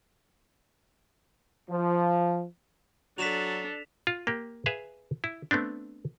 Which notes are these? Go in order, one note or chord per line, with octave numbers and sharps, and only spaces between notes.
F3
F#3 D4 A4 B6 E7 F7
F4
A#3 G4
G#4 B4 E5 F5
E4
A3 B3 C4 D4